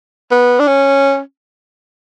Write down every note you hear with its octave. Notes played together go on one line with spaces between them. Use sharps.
B3
D4
C#4